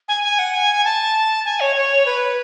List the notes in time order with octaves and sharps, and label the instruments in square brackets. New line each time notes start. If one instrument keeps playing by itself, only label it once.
[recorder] G#5
G#5
F#5
G#5
A5
G#5
C#5
C#5
B4